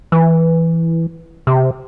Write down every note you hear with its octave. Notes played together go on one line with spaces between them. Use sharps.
E3
C3